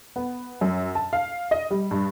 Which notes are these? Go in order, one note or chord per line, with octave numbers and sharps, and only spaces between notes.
B3
F#2
A5
F5
D#5
G3
G2